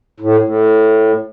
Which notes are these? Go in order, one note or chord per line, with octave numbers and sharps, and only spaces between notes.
A2
A2